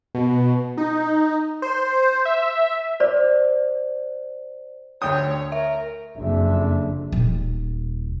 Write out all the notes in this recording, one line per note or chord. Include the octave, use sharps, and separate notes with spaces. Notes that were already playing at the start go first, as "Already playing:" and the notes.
B2
D#4
C5
E5
C5 D5
D2 C#5 G5 D#6
A#4 E5
F#1 F2 D4 E5
D#1